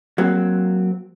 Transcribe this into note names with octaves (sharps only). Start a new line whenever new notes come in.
F#3 A#3 C4